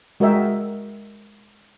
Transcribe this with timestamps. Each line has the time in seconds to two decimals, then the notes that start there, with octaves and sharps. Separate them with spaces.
0.20 G#3 F#4 A#4 D#5 E5 G5